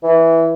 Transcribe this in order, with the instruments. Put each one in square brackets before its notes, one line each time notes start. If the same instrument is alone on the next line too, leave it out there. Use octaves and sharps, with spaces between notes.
[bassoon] E3